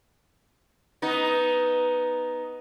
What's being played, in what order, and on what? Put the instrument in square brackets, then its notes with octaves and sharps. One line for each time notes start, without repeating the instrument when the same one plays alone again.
[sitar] B3 D#4